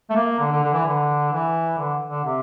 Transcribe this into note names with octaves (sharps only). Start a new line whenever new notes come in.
A3
A#3
D3
D3
D3
E3
D3
E3
D3
D3
C3